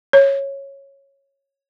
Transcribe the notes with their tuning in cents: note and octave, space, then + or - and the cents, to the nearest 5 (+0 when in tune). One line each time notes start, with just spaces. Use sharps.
C#5 -10